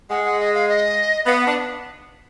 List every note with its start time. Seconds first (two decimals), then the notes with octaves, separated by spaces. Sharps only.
0.10 G#3 F#5
0.24 F#5
0.40 D#5
0.54 F5
0.69 D#5
1.26 B3 F5
1.41 F#5
1.47 D4